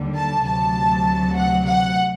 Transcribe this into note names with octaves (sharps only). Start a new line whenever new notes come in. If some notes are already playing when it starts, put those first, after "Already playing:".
Already playing: D#2 D3 G3
A5
D2 C3 F#3 A5
F#5
F#5